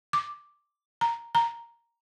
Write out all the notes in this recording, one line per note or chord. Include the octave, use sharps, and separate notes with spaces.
D6
A#5
A#5